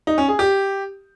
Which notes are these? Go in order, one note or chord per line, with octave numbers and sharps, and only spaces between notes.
D#4
C#4
G#4
G4